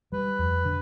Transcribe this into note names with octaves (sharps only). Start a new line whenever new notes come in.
G3 B4
F2
D3